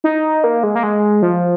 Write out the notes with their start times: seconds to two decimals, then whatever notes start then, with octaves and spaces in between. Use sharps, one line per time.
0.04 D#4
0.44 A#3
0.63 G#3
0.75 A#3
0.83 G#3
1.22 F3